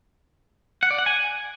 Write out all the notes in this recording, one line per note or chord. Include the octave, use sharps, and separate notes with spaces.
F#5
D5
F#5
G#5